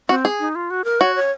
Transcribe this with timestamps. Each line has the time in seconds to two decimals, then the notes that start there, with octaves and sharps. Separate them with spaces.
0.09 C4 F#4
0.25 G#4
0.40 D#4
0.55 F4
0.70 F#4
0.84 A#4
1.01 F#4 C#5
1.16 C#5